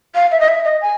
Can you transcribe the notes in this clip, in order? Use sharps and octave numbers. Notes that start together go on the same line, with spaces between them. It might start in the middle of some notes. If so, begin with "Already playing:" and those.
F5
E5
D#5
E5
D#5
G#5